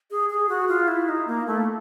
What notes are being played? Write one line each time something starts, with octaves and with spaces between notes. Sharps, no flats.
G#4
G#4
F#4
F4
E4
D#4
A#3
A3